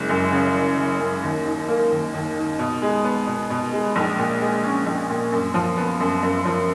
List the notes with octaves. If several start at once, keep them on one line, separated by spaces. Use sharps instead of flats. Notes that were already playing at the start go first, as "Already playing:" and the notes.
Already playing: F#1 G#3
F#2
C#3
F#1
F#1
F#2
D#2
D#3
A#3
D#2
D#2
D#3
B2
G#3
B3
B2
B2
G#3
A#1
A#2
G#3
C#4
A#1
A#2
F#2
F3
B3
F#2
F#2
F3